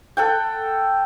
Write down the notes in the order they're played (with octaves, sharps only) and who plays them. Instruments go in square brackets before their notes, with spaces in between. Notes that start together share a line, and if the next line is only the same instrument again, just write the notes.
[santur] A4 F#5 G5